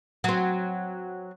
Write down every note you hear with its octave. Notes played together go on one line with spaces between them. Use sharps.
F#3 C4